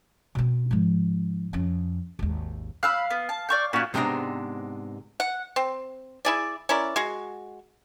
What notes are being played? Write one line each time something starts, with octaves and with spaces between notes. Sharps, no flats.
B2 C4
G#2 F3
F2 C#4
G#1 D#2
F5 B5 E6 F#6
B3
A5
D5 C#6 G6
A#2 C#4 E4 F#4
G#2 C3 G#3 B3 D4 A#5
F#5
C4
E4 G#4 D5
C#4 E4 A#4 D5
G#3 F#4